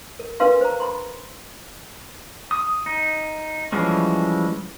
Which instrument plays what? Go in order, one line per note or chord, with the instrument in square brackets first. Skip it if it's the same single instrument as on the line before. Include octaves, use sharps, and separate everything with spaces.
[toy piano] A#4
D4 A#4 B4 F5 C6
C5 A#5
B5 C6
[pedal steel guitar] D#6
D#4
E3 F3 G3 G#3 C#4